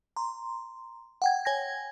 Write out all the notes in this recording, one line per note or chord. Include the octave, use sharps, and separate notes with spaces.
A#5 C6
F#5 G5 G#6
C#5 G#5 G#6 A#6